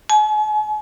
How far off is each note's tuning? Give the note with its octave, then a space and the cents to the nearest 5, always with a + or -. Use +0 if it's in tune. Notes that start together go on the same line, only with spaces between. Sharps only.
G#5 +45